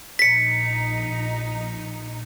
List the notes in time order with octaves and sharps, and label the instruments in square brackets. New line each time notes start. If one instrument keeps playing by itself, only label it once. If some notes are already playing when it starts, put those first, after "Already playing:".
[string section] A#1 D#4 [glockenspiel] B6 C#7